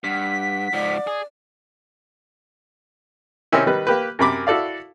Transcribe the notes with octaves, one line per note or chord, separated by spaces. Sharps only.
G2 F#5 B6
G#2 F3 D5
G#4
C3 D#3 C4 C#4 E4
D#3 G3 B4
A#3 G4 B4
F#2 C3 A#4 B5 D6
E4 F#4 A4 D5 F5